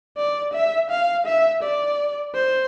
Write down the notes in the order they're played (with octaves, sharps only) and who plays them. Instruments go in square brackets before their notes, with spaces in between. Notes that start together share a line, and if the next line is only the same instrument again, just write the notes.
[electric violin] D5
E5
F5
E5
D5
C5